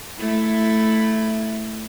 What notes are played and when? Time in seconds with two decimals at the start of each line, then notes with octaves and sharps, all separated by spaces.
0.19 A3 E4